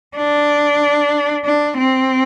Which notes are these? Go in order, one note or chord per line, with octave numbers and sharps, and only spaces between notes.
D4
D4
C4